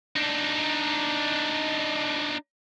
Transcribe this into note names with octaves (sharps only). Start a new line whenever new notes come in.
D4 D#4